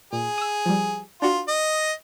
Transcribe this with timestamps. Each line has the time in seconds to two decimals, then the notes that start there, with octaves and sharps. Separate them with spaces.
0.13 A#2 G#4
0.38 D#6 E6
0.66 F3 G3
1.22 D4 F4 F#4
1.48 D#5